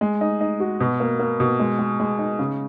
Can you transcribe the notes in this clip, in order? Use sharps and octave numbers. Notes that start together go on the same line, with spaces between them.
G#3
D#4
D#4
F#4
B2
A#3
A#3
B2
G#3
G#3
G#3
D#4
C#3